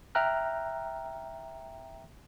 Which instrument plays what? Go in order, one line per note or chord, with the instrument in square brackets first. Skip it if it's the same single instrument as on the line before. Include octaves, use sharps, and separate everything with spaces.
[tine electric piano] E5 G5 A#5 F6 F#6